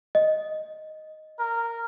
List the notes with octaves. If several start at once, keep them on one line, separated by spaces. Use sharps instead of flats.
D#5
A#4